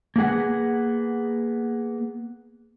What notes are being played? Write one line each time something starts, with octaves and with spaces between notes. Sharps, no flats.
A#3 B3 G#4 F#5